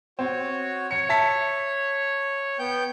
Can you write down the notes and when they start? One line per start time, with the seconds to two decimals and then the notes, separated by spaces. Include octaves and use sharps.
0.19 C4 F#4 C#5
0.91 C#5 C#7
1.09 E5 A5 B6
2.59 B3 G5 G6